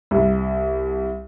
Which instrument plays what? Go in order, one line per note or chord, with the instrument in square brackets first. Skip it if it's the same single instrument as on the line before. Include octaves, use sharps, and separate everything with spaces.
[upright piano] C2